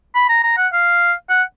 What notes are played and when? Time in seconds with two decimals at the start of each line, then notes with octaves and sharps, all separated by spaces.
0.15 B5
0.29 A#5
0.44 A#5
0.57 F#5
0.73 F5
1.29 F#5